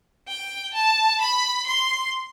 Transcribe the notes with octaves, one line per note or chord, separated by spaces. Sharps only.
G5
A5
B5
C6